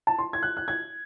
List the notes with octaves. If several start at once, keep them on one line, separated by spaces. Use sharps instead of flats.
A5
C6
G#6
F#6
F#6
G#6